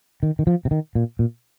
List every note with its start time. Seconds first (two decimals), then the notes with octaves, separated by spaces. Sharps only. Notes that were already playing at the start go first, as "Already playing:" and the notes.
0.23 D#3
0.39 D#3
0.47 F3
0.65 C3
0.71 D#3
0.95 A#2
1.19 A#2